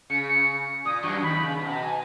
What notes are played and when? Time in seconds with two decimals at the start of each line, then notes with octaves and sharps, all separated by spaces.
0.10 C#3 C#7
0.29 C#7
0.85 A#2 D#6
1.03 F#2 F#3 C#6
1.22 D#2 D#3 B5
1.40 C#3
1.59 B2
1.69 A#5
1.83 G#5